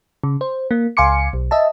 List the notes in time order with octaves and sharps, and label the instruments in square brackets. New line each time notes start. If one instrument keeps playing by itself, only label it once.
[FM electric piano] C#3
C5
A#3
C#2 F5 G#5 C6 D6 C#7
B1
D#5 E5 A5